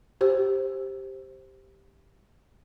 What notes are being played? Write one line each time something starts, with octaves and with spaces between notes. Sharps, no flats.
G4 C5